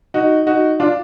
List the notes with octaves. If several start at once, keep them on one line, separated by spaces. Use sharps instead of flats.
D#4 F#4
D#4 F#4
D4 F4